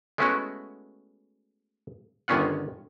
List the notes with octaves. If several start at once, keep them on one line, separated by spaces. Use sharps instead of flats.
G#3 A3 B3 C#4 E4 F#4
G1 D3 D#3 C#4 F4 F#5